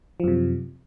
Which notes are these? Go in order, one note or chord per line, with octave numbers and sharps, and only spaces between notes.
F#2 C3 F3